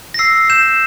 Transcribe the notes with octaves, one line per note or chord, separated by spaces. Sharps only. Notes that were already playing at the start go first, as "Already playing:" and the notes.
A#6
E6 C7
G6 E7